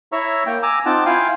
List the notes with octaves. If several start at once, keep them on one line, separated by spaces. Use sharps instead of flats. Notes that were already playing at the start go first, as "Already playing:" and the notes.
E4 C#5 E5 A#5 C#6 E6
A#3 G5
G#5 A#5 D6 E6
C4 D#4 F4 F#5 A5 D6
E4 F4 F5 G5 G#5